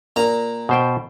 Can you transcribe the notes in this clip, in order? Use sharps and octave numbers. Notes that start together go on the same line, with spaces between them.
A#2 A#5
B2 C5 G5